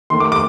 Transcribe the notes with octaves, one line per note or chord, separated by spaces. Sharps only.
D#2 D#3 A3 C6
D6
D6